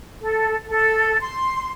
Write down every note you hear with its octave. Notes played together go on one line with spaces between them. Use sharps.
A4
A4
C6